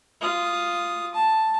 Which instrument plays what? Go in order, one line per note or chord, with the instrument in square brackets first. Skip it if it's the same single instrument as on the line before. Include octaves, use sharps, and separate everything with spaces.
[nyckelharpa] F4 D#6
A5